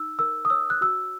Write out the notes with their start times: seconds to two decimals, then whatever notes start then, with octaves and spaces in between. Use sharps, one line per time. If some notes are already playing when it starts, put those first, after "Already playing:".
Already playing: D#4 E6
0.19 A#4 E6
0.45 D#6
0.50 C#5 E6
0.70 F#6
0.81 F#4 E6